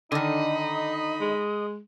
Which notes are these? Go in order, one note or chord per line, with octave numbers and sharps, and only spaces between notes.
D3 D#3 D#4 D#5 B5
G#3